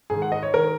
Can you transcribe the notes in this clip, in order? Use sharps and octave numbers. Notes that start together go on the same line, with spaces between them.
G#2 D#3 G#4
F#5
D#5
C#5
D#3 A#4